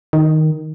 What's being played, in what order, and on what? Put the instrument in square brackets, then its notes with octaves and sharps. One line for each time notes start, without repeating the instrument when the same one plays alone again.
[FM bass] D#3